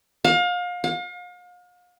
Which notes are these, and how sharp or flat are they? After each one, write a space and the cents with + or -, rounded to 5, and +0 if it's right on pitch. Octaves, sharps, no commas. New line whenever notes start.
F5 +30
F5 +40